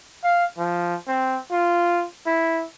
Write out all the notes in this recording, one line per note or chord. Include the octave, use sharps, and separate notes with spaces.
F5
F3
C4
F4
E4